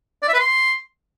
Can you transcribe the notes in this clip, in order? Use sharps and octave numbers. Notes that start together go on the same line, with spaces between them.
D5
E5
B4
C6